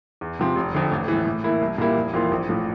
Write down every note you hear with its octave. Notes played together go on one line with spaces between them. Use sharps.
E2
C3 F3 C4
F1
F2 D3
A1
A2 E3
A2
E3 A#3 E4
C2
A#2 G3 A#3 E4
F1
F2 E3 A#3 F4
A#1
A2 F3